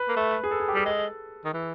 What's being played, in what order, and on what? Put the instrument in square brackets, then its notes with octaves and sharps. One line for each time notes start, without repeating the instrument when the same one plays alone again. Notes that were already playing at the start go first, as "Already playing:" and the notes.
Already playing: [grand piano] B4
[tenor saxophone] A#3
A3
[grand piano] G#4
A4
G#4
G4
[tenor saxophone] G3 [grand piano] G#4
[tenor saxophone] G#3 [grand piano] A4
[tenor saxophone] D#3
E3